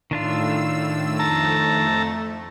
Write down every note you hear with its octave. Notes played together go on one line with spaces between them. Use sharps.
A2 D#3 D4 F4 E6
F2 A3 A5 A#5 E6